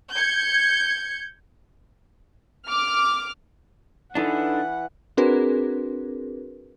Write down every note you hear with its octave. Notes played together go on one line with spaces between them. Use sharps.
G6 G#6 C#7
D6 F6
E3 D4 D#4 A4 B4 F#5
C4 D4 F#4 G#4 A#4 B4